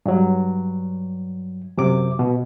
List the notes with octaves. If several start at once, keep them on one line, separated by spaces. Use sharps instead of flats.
G2 F#3
F#2 C3 D6
B2